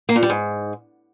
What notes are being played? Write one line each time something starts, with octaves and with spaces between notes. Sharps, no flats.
A#3
A#2
G3
G#2